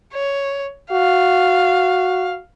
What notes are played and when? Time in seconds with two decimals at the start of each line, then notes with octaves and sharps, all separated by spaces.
0.14 C#5
0.92 F#4 F5